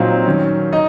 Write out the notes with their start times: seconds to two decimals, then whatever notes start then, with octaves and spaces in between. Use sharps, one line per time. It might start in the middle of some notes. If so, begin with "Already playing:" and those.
Already playing: A#2 F#3 C4 D#4 F5
0.26 D#3 F#3 C#4
0.72 D#4 D#5